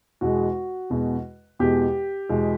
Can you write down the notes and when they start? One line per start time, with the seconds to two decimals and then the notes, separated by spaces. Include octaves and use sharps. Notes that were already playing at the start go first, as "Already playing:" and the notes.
0.21 E2 B2 G#3 F#4
0.90 E2 B2 G#3
1.59 E2 B2 G#3 G4
2.29 E2 B2 G#3